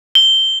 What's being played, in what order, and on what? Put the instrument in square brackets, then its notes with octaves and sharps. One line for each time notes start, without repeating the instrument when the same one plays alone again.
[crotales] G7